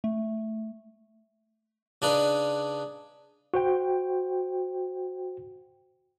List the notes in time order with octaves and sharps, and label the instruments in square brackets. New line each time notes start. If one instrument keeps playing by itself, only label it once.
[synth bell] A3
[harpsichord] C#3 D4 D#4 B4
[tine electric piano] F#4 C5 G5